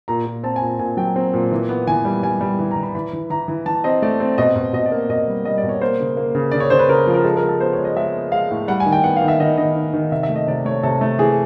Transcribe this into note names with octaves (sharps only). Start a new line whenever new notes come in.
A#2 A#5
A#2
C4 A5
G#5
A#2
A#2 G#5
F#3 G5
C4
A#2
E3
B3
E3 G#5
G3
G3 G#5
G3
E3
A#5
E3
B5
E3 B5
E3
E3 A#5
E3
E3 A5
C4 D#5
A3 D5
C4
B2 D#5
B2
B2 D#5
D5
A#3
D5
B2 D#5
G3
G3 D#5
D5
B2
C#5
A#3 C5
C#3
A#3
C#3
C#3 D5
C#5
C#3 C5
B4
C#3 A#4
F3
A#4
G#3 A4
A#4
G#3
A4
B3 C5
C#5
G#3
D#5
G#3 E5
B3
G#3 F5
A2
G3 F#5
G#5
D#3
G5
B3 F#5
F5
D#3
E5
D#3 D#5
D#3 D#5
D#3
D#3
C3 E5
E5
A3
D#5
C3 D5
A3 C#5
C3 A4
A3
E3 G#4